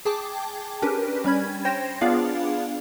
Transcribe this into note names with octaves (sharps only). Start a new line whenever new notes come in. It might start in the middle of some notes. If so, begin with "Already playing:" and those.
G#4 G5 A5 D6
C#4 D4 G4 A#4 B4
G3 C#4 B5 G#6
C5 C#5 G5 C6 A#6
B3 D4 F4 G#4 D5 F5